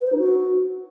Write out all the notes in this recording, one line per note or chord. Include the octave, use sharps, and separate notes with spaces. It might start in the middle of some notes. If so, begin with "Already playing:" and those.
B4
C5
D#4
F#4